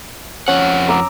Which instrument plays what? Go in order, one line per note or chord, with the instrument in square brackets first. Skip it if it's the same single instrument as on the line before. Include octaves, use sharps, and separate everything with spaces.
[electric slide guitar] F2 F#5 [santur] C#4
[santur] A#5 D6 E6